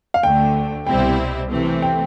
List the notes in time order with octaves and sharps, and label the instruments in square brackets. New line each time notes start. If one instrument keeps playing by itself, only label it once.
[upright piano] F5
[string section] D2 D3 A3 [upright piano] G5
[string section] C2 B2 G3 C4 E4 [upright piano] G5
[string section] C3 E3 A3 C4
[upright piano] G5